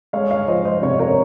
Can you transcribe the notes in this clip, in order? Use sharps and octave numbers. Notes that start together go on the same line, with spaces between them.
G#3 C#5 F5
C#5 F5
F3 C5 D#5
C5 D#5
C3 C#5 F5
A#4 C#5